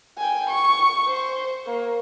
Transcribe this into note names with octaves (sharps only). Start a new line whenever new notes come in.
G5 G#5
C#6
C5
A#3